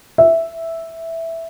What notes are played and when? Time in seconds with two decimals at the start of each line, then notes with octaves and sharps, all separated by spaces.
0.18 E5